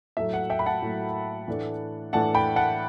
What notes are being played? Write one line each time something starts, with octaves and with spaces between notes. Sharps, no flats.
A2 F#3 A3 E5
F#5
E5 G5
B5
F#5 A5
A2 F#3 A3
A2 E3 A3 D4
A2 E3 A3 D4 F#5 A5
G5 B5
F#5 A5